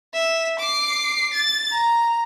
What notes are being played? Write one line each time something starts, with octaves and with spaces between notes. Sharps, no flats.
E5
D6 C7
A6
A#5